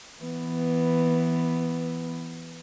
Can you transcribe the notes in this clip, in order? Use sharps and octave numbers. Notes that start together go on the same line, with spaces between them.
E3 B3